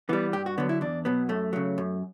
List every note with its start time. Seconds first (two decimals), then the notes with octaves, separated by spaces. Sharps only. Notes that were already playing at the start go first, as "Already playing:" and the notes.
0.09 E3 G3 B3
0.33 G2 G4
0.46 F#4
0.58 D3 F#3 B3
0.69 E4
0.81 E2 D4
1.05 B2 F#3 B3
1.29 F#2 A3
1.53 C#3 F#3
1.78 F#2